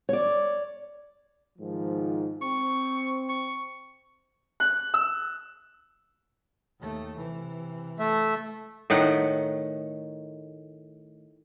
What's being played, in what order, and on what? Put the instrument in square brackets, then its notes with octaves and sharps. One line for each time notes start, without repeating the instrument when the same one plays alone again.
[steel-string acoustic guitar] C#5 D5
[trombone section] G#2 D#3 F3
[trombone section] C4 [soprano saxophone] C#6
[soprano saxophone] C#6
[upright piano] F#6
E6
[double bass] D#2 A3
C3 E3
[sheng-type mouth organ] A3 E5
[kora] A2 D#3 A3 F#5